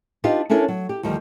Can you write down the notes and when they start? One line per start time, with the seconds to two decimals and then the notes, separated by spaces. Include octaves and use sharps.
0.24 D4 D#4 F4 G4 B4
0.49 C#4 D4 E4 A4 A#4 C#5
0.68 F#3
0.89 G4
1.03 D2 D#3 F3 G3